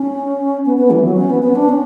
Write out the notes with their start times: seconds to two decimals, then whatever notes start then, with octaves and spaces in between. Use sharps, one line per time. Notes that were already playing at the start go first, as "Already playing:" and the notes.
Already playing: C#4
0.66 B3
0.77 B3
0.91 E3
1.04 F#3
1.17 C#4
1.30 B3
1.42 B3
1.55 D4
1.69 C#4